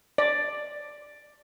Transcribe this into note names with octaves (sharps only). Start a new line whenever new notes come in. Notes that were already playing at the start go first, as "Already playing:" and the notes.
D5